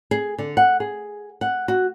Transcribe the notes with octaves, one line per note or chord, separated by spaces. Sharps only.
G#4
D3
F#5
G#4
F#5
F#4